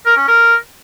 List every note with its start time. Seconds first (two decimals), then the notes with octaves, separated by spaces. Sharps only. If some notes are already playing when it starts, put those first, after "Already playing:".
0.06 A#4
0.17 C#4
0.28 A#4